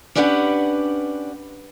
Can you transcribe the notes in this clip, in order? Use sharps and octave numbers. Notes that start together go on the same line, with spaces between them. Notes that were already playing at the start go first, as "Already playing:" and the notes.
C#4 D4 E4 G4 B4 F#5